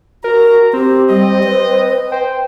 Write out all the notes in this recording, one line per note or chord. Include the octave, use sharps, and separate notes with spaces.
F#4 A#4 A#5
C4 G4
G3 D#5
B4
C5 G5